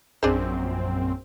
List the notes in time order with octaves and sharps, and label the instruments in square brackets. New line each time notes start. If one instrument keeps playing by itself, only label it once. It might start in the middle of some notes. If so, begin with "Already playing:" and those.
[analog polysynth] A#1 F#2 C4 [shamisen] D4 G#4 C5